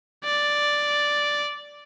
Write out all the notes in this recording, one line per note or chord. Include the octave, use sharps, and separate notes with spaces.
D5